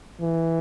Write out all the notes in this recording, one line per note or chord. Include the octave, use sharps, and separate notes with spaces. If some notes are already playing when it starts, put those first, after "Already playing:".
E3